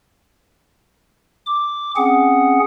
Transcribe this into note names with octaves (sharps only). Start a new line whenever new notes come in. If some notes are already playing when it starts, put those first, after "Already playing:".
D6
C4 C#4 G#4 F#5